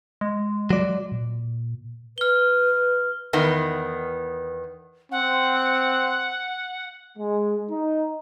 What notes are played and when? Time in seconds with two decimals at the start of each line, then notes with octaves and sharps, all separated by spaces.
0.21 G#3
0.70 F#3 D5
1.12 A#2
2.18 B4 F6 G7
3.33 E2 D#3 B3
5.12 C4 F#5
7.18 G#3
7.70 D#4